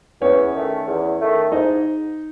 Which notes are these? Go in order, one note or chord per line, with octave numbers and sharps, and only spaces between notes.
E2 C#4 C#5
D#3 A3
E2
D#3 A3
G#2 D#4 D#5